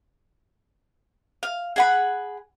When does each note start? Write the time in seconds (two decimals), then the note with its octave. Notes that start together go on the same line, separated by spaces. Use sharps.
1.43 F5
1.76 G#4 F#5 B5